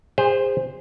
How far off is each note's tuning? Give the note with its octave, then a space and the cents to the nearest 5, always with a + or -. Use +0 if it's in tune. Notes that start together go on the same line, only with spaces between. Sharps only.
G#4 -35 C5 +0